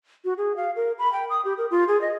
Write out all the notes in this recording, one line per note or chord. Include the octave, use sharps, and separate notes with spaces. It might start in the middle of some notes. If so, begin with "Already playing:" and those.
F#4
G#4
F5
A#4
B5
G5
D#6
G4
A#4
F4
G#4
D#5